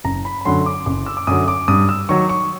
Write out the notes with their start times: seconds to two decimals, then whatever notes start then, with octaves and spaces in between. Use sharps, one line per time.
0.04 F#1 A#5
0.25 B5
0.41 B5
0.45 F#2 D3 F#3 C6
0.66 D6
0.86 F#1 D6
1.06 E6
1.17 D6
1.27 F#2 D3 F#3 D#6
1.48 D6
1.68 G2 D#6
1.89 E6
2.09 D#3 F#3 C#6
2.29 C#6